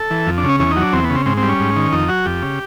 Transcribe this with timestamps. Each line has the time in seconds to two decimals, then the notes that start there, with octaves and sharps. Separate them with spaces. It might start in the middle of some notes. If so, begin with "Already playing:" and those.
Already playing: A4
0.11 E3
0.27 F2
0.38 D4
0.43 C#3
0.49 C#4
0.60 E2 C#4
0.71 D#4
0.76 F#3
0.82 D4
0.93 E2 C4
1.04 B3
1.10 C#3
1.15 C4
1.26 G#2 C4
1.37 C4
1.43 G3
1.49 C#4
1.60 G#2
1.76 D#3
1.92 F2 D#4
2.08 F#3 F#4
2.26 F2 G4
2.42 C#3